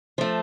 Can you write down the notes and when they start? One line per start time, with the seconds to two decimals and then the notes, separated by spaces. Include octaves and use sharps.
0.18 F3 A3